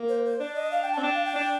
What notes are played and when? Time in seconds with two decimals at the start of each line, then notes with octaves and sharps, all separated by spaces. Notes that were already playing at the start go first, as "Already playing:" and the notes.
Already playing: A#3
0.09 C5
0.24 C5
0.40 D4 D5
0.55 D#5
0.71 F5
0.82 G5
0.92 A5
0.98 C4
1.03 D4 G5
1.14 F5
1.25 G5
1.35 D4